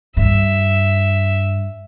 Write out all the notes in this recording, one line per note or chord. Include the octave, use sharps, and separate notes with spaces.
G2 E5